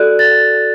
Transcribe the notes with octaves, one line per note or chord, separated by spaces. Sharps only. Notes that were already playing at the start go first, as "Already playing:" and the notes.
Already playing: F#4 A4 D5 F#6
A6